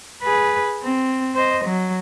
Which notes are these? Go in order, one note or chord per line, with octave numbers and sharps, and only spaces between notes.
G#4 B4
C4
C5 D#5
F#3